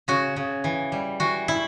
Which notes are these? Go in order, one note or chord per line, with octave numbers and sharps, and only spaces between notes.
C#3 F#4
C#3
E3
G3
E3 F#4
E4